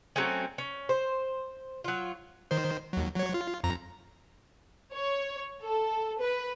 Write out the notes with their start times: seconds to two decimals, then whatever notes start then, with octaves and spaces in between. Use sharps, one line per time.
0.16 F#3 A3 C4 C#4
0.58 C#4
0.89 C5
1.84 F#3 F4
2.51 D#3 C5
2.93 D#2 F#3
3.16 F#3 C#5
3.34 F4
3.64 F2 A#5
4.94 C#5
5.62 A4
6.20 B4